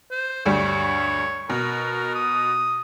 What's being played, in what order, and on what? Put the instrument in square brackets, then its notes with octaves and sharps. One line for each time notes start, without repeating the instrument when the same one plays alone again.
[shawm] C5
[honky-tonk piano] D2 G2 G3 [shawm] C#5
[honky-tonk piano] B2 [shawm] A#4
[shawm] D#6